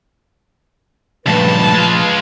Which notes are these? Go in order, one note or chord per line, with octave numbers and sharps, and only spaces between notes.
C#2 G2 A#2 F3 A3 B4 A5
G#3 F4